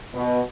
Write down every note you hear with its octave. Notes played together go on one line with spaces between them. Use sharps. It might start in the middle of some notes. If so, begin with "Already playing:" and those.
B2